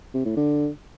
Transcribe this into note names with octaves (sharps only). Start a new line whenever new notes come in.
C3
A2
D3